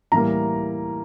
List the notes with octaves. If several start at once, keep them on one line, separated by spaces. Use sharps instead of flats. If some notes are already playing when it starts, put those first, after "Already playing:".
A2 E3 G3 A#3 A#5